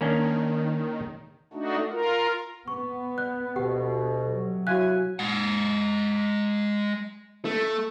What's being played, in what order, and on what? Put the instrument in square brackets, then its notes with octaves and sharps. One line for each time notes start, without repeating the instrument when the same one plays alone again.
[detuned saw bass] D#3 [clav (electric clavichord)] A#3 C#4 D4
[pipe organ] A3 D4 D#4 F#4
F4 A#4
[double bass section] B3 [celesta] C#6
[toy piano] D5 [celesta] F#6
[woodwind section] D2 B2 [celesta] G4 [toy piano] F#5
[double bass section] C3 F#3
[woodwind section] E4 C#5 G#5 [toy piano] F#4 F5 [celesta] F#6
[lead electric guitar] G#3 F#5
A3